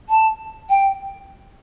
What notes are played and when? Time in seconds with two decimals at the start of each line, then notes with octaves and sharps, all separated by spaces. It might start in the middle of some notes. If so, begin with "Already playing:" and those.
0.09 A5
0.69 G5